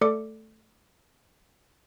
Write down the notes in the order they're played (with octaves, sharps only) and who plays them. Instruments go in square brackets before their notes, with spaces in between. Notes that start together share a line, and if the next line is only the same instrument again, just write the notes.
[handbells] A3 A4 D5 D6 C#7